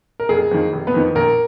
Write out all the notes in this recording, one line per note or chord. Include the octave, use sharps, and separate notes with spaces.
A#4
F1 G#4
F2 D#3
F1
B3 B4
F2 D#3
A#1 A#4